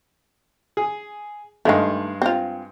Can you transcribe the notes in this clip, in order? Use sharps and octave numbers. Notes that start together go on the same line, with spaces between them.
G#4
G2 D#3 G#3 A3 F5
C4 F4